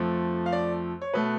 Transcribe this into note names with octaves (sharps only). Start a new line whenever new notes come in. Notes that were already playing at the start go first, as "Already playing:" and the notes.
Already playing: F2 F3 A3
F5
D5
C#5
B2 A3 B4